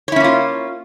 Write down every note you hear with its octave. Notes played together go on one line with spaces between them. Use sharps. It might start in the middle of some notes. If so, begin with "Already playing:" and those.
A#3 C#4 E4 F4 C#5